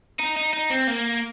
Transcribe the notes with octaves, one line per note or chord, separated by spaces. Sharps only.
D#4
D#4
D#4
C4
A#3